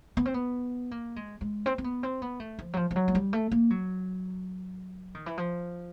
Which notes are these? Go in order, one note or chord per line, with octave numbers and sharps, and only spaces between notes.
B3
C4
B3
A#3
G#3
G#3
C4
C4
B3
C4
B3
A3
F3
F#3
F3
F3
F#3
G#3
G3
A3
A#3
F#3
D#3
E3
F3